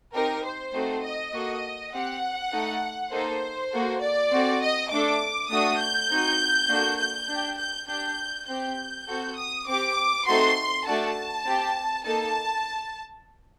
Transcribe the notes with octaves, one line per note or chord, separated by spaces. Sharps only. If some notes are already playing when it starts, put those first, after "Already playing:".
C4 D#4 G4 A#4
C5
A3 C4 D#4 F#4 A4
D#5
A#3 F#4 A4
C4 G4 F#5
A3 D#4 A4
A#3 D#4 A4 C5
A#3 F#4 A4
D5
C4 F#4 A4
D#5
A3 D4 A4 D6
A3 D4 F#4 A4 D#6
G6
C4 D#4 F#4
A#3 D4 F#4 A4
G6
D4 G4
G6
D4 G4 G6
C4 G4 G6
C4 F#4 A4
D#6
C4 G4 D6
A3 C4 D#4 F#4 A4 C6
A3 D4 F#4 A4 A5
C4 G4
A#3 D#4 A4 A5